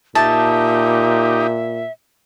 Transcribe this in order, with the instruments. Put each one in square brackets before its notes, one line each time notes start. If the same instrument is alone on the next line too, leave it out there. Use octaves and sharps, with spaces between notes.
[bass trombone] A#2 [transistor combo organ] D#4 G4 [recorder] E5 [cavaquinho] A5